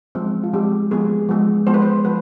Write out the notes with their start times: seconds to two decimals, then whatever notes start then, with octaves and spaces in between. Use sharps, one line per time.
0.15 F3 G#3 C4
0.44 F4
0.53 F3 G#3 C4 G4
0.91 F3 G#3 B3 G#4
1.29 F3 G#3 B3
1.67 F3 G#3 B3 C5
1.74 B4
1.82 C5
2.05 F3 B4